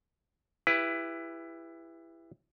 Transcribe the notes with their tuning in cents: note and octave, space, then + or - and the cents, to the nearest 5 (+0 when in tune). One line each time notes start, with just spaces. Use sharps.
E4 +15 G4 +35 B4 +0